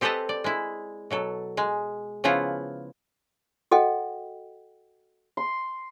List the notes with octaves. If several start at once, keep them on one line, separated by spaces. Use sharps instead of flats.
C4 G4 A4 B4 D#5 A5
D5
G#3 E4
B2 F#3 A4
G#3
C#3 F3 B3 E4 F4
F#4 A4 D#5 F#5 G5
C6